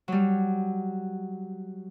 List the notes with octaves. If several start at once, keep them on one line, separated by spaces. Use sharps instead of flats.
F#3 G3